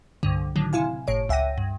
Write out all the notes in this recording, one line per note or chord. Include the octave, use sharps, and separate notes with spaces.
C2 G2 D3
A2 D3 D#3 F#3
C3 E4 F5 G#5
G1 A2 C#5 D7
C#2 E5 F#5 G5 A#6 D#7
G2